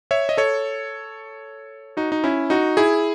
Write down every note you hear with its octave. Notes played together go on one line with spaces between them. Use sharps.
C#5 E5
D#5
A4 C#5
D#4 F#4
D#4
C#4 E4
D#4 F#4
E4 G#4